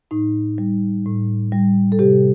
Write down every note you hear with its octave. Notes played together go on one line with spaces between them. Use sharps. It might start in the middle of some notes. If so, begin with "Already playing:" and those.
A2 D#4
G3
A2
G3
A4
C3 G4